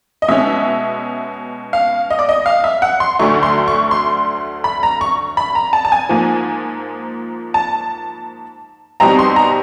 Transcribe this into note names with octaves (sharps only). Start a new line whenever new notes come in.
D#5
B2 G#3 C#4 E5
F5
D#5
D5
D#5
F5
E5
F#5
C6
D2 D3 F#3 A3 C#6
C6
C#6
C6
B5
A#5
C#6
B5
A#5
A5
A5
G#5
G#2 F3 A#3
A5
B2 G3 C4 D#4 A#5
C6
A#5